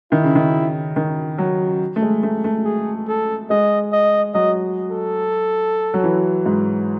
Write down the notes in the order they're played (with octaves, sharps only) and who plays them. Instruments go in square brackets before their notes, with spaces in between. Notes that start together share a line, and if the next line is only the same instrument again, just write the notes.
[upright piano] D#3 [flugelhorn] E4
[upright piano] C#3
D#3
D#3
F#3
A3
G#3
A3
A3
[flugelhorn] G#4
A4
[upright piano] G#3 [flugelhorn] D#5
[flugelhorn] D#5
[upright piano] F#3 [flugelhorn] D#5
[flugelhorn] A4
[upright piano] F#3
E3
G#2